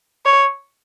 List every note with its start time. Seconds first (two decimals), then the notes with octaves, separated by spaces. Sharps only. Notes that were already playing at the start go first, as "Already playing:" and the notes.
0.26 C#5